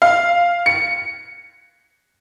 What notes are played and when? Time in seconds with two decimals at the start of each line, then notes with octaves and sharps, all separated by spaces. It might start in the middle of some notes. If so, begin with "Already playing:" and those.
0.02 F5
0.66 C#7